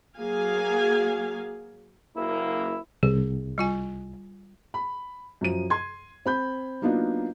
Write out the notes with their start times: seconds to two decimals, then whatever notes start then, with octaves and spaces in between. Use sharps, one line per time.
0.18 F#3 A#3 G#4 F5 G#5
2.17 F#1 A#3 E4
3.03 C2 G#4
3.58 G3 F4 G#5
4.74 B5
5.41 F#2 F3 D#7
5.70 C6 G#6
6.26 C4 B5 G6
6.82 F#3 A#3 B3 D4 D#4 F4